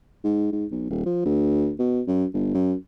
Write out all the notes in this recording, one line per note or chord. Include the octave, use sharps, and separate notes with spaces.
G#2
G#2
B1
D#1
F3
D2
B2
F#2
G1
F#2